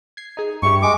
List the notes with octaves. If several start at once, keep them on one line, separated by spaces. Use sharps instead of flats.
G#6 C7
D#4 G#4
G2 E4 G4 C#6
G#3 D6